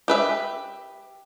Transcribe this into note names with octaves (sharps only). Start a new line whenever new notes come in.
G4 B4 E5